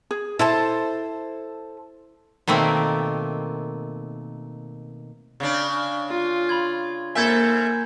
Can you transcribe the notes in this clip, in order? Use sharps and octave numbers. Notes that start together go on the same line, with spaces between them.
G#4
E4 A4 C5 A5
B2 D#3 A3 A#3 C4
C#3 D4
F4
B5 C6 G#6
G#2 A#3 A4 E5 G#5 G6 G#6